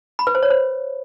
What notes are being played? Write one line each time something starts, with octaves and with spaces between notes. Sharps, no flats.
B5
B4
C5
C#5
C5